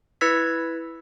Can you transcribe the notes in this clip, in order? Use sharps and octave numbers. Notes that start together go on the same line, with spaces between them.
E4 B4 E6 G#6 B6